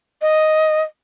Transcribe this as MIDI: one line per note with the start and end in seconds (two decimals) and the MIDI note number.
0.22 0.81 75